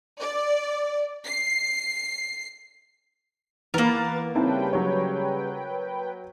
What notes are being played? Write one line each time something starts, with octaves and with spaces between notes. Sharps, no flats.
D5
C7
E2 A#3 A#4 B4 A6
C#3 G3 C4 E4 B4 G5 A5
F#3 C#5